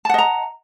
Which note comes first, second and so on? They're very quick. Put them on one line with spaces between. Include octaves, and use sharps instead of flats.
A5 F#5 D#5 A#5